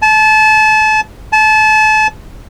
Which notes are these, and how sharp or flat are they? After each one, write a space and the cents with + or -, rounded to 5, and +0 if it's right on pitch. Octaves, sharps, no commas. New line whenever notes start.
A5 -30
A5 -30